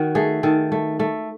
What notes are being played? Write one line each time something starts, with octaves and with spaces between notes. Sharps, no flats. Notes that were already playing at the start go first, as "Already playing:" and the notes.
Already playing: D#3 F#4
A3 G#4
D#3 A4
A3
A3